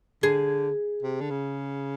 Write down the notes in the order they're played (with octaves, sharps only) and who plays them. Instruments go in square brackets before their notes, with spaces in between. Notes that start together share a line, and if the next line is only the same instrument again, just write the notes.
[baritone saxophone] D3 [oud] G#4
[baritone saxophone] C3
D3
C#3